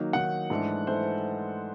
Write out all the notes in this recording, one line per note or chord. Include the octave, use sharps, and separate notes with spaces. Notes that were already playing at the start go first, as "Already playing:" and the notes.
Already playing: D#3 F#3 A#3 D#4
D#3 F#3 A#3 D#4 F#5
G#2 E3 A3 D4
E3 A3 C5